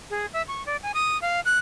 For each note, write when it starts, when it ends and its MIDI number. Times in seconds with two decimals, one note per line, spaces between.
0.10 0.26 68
0.33 0.42 76
0.48 0.65 85
0.66 0.77 74
0.83 0.92 80
0.94 1.20 87
1.22 1.40 77
1.45 1.58 90